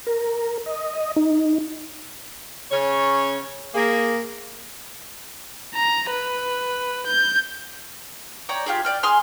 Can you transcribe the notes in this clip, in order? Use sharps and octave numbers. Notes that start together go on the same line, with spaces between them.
A#4
D#5
D#4
C#3 C#4 C#5
A#3 G#4
A#5
B4
G6
C#5 D5 G5 A#5
F4 G4 G#4
D5 G5 F6
G#4 G#5 C6 F6